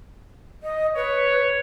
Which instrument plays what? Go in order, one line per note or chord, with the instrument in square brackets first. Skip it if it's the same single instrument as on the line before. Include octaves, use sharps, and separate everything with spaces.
[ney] D#5
[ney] B4 [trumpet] C#5